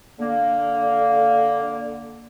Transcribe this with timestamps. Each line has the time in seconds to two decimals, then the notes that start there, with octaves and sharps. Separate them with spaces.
0.19 D3 A#3